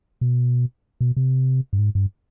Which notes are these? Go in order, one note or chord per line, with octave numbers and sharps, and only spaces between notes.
B2
B2
C3
G2
G#2
G2